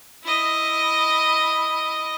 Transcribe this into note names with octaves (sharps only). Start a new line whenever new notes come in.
E4 D#5